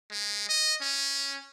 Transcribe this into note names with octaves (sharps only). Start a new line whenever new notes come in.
G#3
D#5
C#4